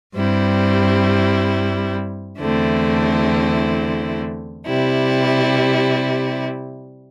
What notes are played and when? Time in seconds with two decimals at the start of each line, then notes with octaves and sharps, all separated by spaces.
0.14 G2 G3 C4 E4
2.40 E2 D3 A3 C4 E4
4.65 C3 G3 E4